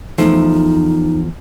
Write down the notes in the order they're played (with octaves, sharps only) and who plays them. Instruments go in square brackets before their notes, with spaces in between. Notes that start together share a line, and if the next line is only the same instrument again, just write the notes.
[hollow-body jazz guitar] E2 F3 A3 [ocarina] D#4